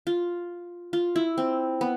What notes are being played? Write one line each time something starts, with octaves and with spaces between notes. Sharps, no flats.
F4
F4
E4
C4
B3